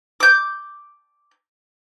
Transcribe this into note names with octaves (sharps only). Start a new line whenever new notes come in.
D6 G6